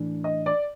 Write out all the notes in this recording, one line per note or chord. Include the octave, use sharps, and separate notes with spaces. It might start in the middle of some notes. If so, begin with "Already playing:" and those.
Already playing: A2 E3 A3 D4
D#5
D5